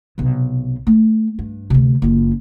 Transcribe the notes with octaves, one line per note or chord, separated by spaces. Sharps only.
B1 C3
A3
G2
D2 C3
F#1 F4